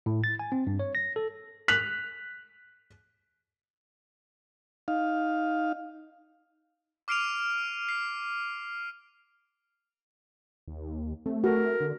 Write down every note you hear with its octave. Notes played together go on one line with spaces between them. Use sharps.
A2
A6
G#5
C4
G2
C#5
A#6
A4
F#6 B6 F7 F#7
D#4 F5
D6 F6 C7 D7 D#7 F7
C7
D#2
A3 C4
F#4 A4 A#4
D3